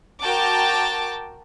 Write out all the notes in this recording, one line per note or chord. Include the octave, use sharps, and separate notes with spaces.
F#4 A#4 G5 A5 D6